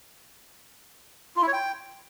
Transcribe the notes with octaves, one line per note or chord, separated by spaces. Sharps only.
F4
E4
C#5
G5